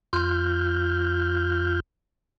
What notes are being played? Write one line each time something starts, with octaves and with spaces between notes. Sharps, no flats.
F2 F4 F6 G6